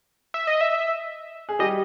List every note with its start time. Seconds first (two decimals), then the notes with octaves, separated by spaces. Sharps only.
0.34 E5
0.47 D#5
0.61 E5
1.49 G#4
1.59 G3 G4 D#5